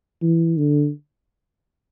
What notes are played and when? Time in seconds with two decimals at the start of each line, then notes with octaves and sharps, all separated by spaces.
0.22 E3
0.57 D3